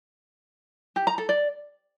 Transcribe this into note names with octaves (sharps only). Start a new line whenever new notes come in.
G4
A#5
A4
D5